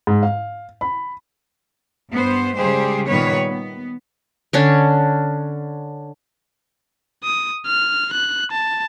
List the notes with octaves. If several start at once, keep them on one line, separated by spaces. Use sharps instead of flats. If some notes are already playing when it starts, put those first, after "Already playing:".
G#2
F5
B5
G2 B3 C5
C#3 G3 G#3 G4 G#4 C5
A#2 D#3 G3 B3 B4 C#5
B3
D3 C#4 D4
D#6
F6
F#6
A5